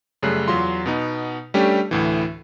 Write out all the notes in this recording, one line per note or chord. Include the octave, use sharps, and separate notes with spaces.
F#2 C#3 G3 A3 F#6 C7
E2 F#3 F4 C6
B2 B3 D#4
G3 A3 C#4 D4 G4
D2 A2 E3